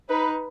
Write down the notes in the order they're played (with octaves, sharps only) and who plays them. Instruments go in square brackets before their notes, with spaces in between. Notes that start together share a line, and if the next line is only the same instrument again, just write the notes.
[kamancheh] D#4 [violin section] B4